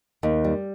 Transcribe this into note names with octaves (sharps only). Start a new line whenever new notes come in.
D#2
G3